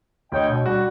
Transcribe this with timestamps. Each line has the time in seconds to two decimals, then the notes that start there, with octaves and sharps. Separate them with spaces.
0.32 D2 C#5 D#5 G5
0.50 B2
0.66 G3 F#4